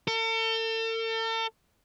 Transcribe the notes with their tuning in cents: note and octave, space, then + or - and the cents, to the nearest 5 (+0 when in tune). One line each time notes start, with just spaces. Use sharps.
A4 +40